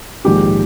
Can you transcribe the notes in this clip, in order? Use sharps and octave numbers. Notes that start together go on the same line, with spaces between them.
A#1 G#2 D#3 G4